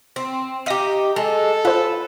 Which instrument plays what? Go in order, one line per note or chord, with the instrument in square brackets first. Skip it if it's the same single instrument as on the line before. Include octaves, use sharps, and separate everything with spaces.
[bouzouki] C4
[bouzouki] D#4 G4 [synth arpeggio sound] E5 F5 A#6
[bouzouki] G#3 [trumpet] A4
[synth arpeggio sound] F4 C5 [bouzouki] B4